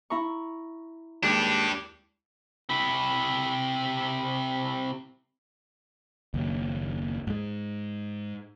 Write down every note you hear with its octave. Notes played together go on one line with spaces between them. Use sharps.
E4 A#5 C#6
D#2 G#3 D4 G4 D6 G6
C3 E4
F#1 D#2
G#2 G#3